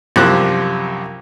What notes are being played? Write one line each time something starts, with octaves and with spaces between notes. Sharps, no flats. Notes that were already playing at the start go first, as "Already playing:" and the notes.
C2 F#2 F3 G3 D6 F#6